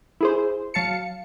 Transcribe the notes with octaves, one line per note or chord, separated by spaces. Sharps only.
E4 G#4 C5
F#3 F5 A5 C#7